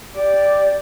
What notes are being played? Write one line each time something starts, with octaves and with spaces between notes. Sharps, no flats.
G4 D5 G5 D6